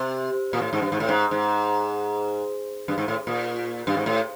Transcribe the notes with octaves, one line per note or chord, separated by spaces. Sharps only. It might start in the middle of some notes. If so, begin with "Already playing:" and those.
Already playing: C3
A#2
A2
G#2
G2
G#2
A2
G#2
G#2
G2
G#2
A2
A#2
G2
G#2
A2